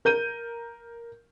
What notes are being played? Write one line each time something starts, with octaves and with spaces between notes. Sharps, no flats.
A#4 G6 D#7